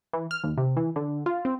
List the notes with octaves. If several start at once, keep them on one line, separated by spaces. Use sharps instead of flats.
E3
F6
D#2
C3
E3
D3
F4
C4